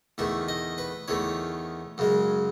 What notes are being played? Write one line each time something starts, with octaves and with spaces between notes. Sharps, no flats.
E2 D#3 A3 E5
D#5
B4
E2 D#3 A3 C#5
F#2 C#3 G#3